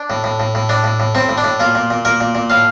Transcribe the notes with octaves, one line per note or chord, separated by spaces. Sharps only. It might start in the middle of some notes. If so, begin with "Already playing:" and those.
Already playing: D4
A2
A2
A2
A2
A2 D4
A2
A2
A2 C4
A2
D4
A2
A#2 F4
A#2
A#2
A#2 A#4
A#2
A#2
A2 F5